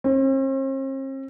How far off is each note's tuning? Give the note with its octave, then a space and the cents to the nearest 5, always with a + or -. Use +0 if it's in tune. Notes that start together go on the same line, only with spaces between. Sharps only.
C4 +45